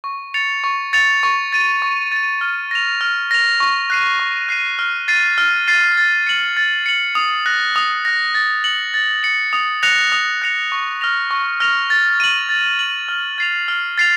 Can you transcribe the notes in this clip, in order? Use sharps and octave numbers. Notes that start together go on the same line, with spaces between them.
C#6
A6 C#7 F7
C#6
A6 C#7 F7
C#6
A6 D#7
C#6
A6 D#7
F6
A#6 F7
F6
A#6 F7
C#6
F#6 C7 D#7
C#6
F#6 C7 D#7
F6
A6 C7 D#7
F6
A6 C7 D#7
A6
C#7 F#7
A6
C#7 F#7
D#6
F#6 A#6
D#6
F#6 A#6
A6
C#7 F#7
A6
C#7 F#7
D#6
F#6 A#6 C#7 F7
D#6
F#6 A#6 C#7 F7
C#6
F6 A#6 F7
C#6
F6 A#6 F7
A6
D#7 F#7
A6
D#7 F#7
F6
A6 C7 F7
F6
A6 C7 F7